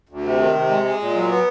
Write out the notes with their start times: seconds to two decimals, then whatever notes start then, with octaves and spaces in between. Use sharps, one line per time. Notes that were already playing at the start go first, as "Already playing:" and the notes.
0.09 D2
0.23 C3
0.39 D#3
0.55 C3
0.69 G#3
0.83 G#3
1.00 A#2
1.14 F#3
1.29 B3